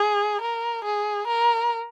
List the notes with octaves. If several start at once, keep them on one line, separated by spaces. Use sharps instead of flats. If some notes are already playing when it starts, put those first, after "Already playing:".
Already playing: G#4
A#4
G#4
A#4